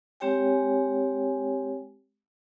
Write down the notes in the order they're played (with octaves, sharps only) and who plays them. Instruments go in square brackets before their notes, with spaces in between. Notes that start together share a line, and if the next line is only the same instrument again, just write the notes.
[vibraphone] G#3 C4 G4 C#5 G5 G#5